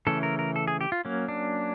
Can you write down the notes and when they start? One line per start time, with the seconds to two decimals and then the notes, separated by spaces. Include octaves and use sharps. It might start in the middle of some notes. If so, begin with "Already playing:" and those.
0.07 C#3 E3 A3 C#4 A4
0.23 A#4
0.39 A#4
0.56 A4
0.68 G#4
0.81 G4
0.92 F4
1.05 F#3 A#3 C#4
1.28 D4